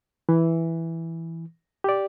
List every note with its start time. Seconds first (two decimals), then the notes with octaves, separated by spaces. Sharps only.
0.29 E3
1.84 G4 D5